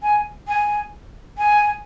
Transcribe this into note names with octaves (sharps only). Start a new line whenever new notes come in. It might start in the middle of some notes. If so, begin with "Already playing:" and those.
G#5
G#5
G#5